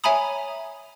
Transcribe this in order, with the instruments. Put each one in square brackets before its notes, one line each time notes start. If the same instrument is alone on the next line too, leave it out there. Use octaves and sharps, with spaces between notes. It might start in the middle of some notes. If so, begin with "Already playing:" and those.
[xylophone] C#5 E5 G#5 A#5 B5 D#6